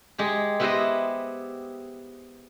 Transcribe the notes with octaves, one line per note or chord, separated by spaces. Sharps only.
G#3 G4 G#4
B3 E4 G4 B4 C5 D#5